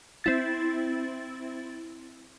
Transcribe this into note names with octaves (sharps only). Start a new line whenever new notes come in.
C4 E4 A6